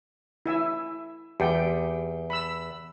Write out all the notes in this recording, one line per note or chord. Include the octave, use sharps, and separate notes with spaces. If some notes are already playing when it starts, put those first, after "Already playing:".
E4 E5 G#5
E2 G4 G5
B5 E6